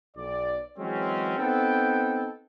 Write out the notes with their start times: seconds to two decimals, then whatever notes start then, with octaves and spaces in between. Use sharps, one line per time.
0.16 B1 D5
0.79 E3 F#3 G#3 C4 C#4
1.38 B3 C4 D#4 A4 G5